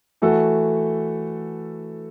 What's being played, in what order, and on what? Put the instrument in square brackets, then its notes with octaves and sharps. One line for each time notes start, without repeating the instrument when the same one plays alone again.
[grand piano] E3 A3 F#4 A4